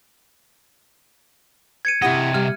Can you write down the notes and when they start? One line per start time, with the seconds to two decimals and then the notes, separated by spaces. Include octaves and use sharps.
1.85 G#6 C#7 D#7
2.02 C3 E4 F#4 G4 D#5 F#5
2.34 G3 F6